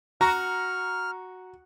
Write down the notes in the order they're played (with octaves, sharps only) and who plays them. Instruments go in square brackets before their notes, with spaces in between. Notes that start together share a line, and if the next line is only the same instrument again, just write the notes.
[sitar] F#4 [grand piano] A#5 [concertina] F6